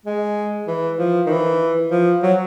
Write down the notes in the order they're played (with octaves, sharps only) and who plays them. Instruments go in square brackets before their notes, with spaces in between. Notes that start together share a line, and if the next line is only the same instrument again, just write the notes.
[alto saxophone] G#3
E3
F3
D#3
E3
F3
F#3